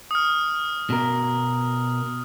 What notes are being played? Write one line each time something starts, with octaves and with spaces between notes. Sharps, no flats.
D#6 F6
B2 A#4